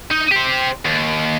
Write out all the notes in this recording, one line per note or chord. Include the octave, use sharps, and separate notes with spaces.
D#4
G4 C5
D#2